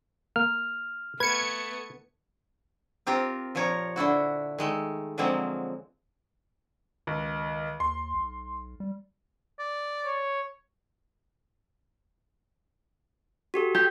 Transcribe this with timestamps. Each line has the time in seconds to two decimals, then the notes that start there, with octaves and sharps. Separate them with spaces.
0.36 A#3 F6
1.20 A3 B3 B4 G#6 C#7
3.07 C4 F4 G4 A#4
3.55 A#2 F3 A#4 C#5 A#5
3.96 D3 D4 E4 F#4
4.58 D#3 G#3 A3
5.18 D3 F3 F#3 G#3 A#3 C4
7.07 C#2 D#3
7.80 D#2 C6
8.14 B1
8.80 G3
9.59 D5
10.05 C#5
13.54 F#4 G4 A4
13.75 G4 G#6